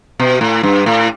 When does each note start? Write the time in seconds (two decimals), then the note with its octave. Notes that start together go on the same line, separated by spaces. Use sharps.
0.20 B2
0.41 A2
0.63 G2
0.86 A2